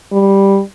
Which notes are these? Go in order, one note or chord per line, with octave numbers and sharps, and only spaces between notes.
G3